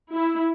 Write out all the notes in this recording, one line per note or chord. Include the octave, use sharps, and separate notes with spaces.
E4